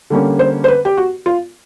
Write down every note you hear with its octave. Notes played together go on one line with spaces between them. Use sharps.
D3 G3 A#3 C#4
C5
C5
B4
G4
F#4
F4